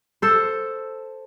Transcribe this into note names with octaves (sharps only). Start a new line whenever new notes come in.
A4 C5